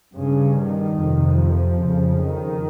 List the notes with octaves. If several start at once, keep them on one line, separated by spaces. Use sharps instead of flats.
G2 C#3
D#3
F2 C3
F3
F2 C#3
D#3